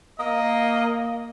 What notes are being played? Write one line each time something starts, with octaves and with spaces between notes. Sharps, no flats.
A#3 D#5